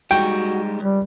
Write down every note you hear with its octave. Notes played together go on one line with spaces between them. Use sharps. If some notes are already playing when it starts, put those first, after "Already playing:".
G3 G#3 D#4 F#4 G5
C#2 G3